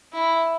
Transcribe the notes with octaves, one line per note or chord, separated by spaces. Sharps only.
E4